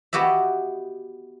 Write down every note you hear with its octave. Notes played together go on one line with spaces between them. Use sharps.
B3 F#4 G4 D#5 E5